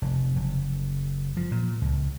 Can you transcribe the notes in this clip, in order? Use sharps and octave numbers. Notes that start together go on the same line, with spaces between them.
F1
F#1
F3
A#2
C#2